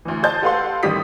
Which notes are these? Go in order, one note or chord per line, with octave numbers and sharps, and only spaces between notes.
D2 E3
C5 D#5 A5 G6 A6
G4 A4 B4 F5 F#5 C6
A1 D#3 G3 D#6 B6